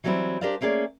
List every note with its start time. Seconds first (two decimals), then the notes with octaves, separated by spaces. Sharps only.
0.04 E3 F#3 G3 A3 C4 E4
0.41 D4 G4 A#4 C5 D5 F5
0.61 A3 A#3 C#4 G#4 D5